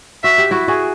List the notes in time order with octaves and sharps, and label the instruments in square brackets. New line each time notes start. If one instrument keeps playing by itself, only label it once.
[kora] F#4 [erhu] E5
[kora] G4
E4 F#4
F#4 G#4